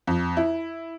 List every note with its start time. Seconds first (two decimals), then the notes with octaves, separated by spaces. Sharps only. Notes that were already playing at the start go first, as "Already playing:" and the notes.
0.07 F2
0.37 E4